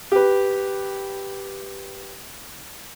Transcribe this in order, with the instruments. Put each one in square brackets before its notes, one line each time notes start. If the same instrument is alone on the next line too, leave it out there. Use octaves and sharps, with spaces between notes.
[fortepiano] G4 B4